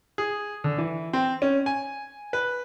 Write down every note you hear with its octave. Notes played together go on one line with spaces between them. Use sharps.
G#4
D3
E3
C4
C#4
G#5
B4